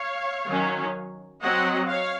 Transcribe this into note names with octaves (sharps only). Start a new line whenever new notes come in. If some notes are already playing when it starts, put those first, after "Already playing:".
Already playing: C#5 F5
D#3 F#3 C#4
F#3 C4 D#5 F#5
C#5 F5